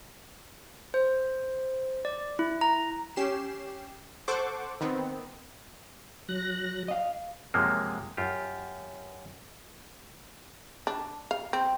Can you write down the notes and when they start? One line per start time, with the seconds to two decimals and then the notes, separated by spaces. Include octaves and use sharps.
0.94 C5
2.05 D5
2.39 E4
2.61 A#5
3.16 C#4 G4 C7 E7
4.28 A4 C5 F#5 C#6 D6
4.81 D#3 B3 C4
6.29 F#3 F#6 A#6
6.88 D#5 F5
7.54 F#2 C3 F3 G#3 A#3
8.17 F#2 F4 G4
10.87 D4
11.31 F5
11.53 C4